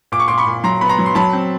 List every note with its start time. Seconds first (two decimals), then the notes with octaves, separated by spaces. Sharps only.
0.12 A#2 D6
0.20 C#6
0.28 A#2 C6 D6
0.38 B5 C#6
0.47 A#2
0.64 F#3 A#5 C6
0.81 B3 B5
0.89 A#5 C6
0.99 F#3
1.06 C6
1.15 F#3 A5 B5
1.33 C4